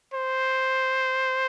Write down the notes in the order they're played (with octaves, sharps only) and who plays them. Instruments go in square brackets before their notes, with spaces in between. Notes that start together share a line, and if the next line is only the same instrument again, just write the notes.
[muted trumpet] C5